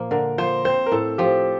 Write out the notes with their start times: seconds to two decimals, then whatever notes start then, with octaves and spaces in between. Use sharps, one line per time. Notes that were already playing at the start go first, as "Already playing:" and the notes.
Already playing: A#2 F3 A#3
0.11 D3 A#4
0.38 F3 C5
0.65 C4 C5
0.86 A#4
0.92 A2 A4
1.18 F3 G4